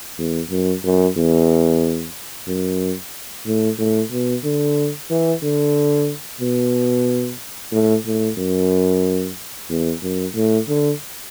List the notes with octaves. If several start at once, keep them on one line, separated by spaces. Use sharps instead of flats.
E2
F#2
F#2
E2
F#2
A2
A2
B2
D3
E3
D3
B2
A2
A2
F#2
E2
F#2
A2
D3